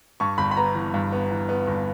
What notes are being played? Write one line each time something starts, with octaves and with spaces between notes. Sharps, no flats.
G2 C#6
G1 B5
B5
B3 A#5
E3
G2
B3
E3
B3
G1